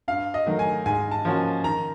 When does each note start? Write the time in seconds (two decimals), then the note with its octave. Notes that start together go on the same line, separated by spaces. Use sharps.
0.08 G2 F5
0.34 D#5
0.46 D#3 F#3 A3
0.59 G#5
0.86 G#2 G#5
1.11 A5
1.25 F3 A#3 C#4 F#4
1.64 D#3 A#5